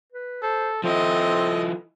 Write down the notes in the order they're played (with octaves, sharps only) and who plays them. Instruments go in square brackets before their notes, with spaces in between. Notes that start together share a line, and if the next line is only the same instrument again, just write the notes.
[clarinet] B4
[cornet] A4 [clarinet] C5
[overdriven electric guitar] F3 E4 [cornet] C4 [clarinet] A4 [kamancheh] D#5